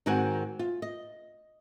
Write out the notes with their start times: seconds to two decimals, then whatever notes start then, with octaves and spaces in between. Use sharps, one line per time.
0.06 G#2 D#3 C4 F#4 F#5 G#5
0.59 F4
0.82 D#5